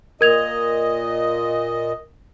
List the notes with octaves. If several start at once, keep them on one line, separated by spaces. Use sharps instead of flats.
A#2 A#4 D#5 G#6 F7